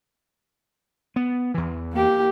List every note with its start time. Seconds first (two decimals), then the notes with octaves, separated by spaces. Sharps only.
1.16 B3
1.54 E2 E3
1.93 A#3 G4